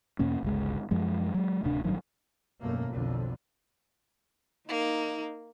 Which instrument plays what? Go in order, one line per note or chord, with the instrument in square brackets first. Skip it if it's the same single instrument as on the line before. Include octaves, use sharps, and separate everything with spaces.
[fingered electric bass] E2 B2 A#3 C#4
G1 C#2 G#3
F#2 F3 G#3
F#3 G#3
D1 D2 C3 D4
A1 G2 D#3 F#3
[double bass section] G#1 F#2 B2 A3 A#3
B1 F2 D3
[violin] A#3 [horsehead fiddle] D#4